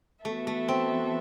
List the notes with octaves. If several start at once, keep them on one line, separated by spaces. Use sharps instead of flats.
E3 A3 B3 F#4 A4 E5
A3
C4